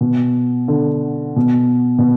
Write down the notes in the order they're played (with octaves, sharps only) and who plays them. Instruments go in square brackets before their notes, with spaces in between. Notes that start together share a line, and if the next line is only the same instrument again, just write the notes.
[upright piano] B2
D3
B2
B2